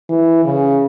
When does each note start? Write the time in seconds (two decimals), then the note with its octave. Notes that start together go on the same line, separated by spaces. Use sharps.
0.09 E3
0.45 C#3